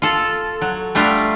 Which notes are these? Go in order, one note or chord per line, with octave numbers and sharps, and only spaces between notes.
F4 A4
F#3
G3 A3 D4 F4